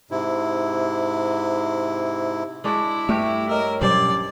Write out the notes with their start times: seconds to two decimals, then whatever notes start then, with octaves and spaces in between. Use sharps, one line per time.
0.11 G#2 C3 E4
2.64 G#3 D4 E4 F#4
3.09 G2 A3 F#4 G4 E5 C#6 D6
3.49 A#4 C#5 D#5 E6
3.81 B2 F#3 G3 C#4 G4 C5 D5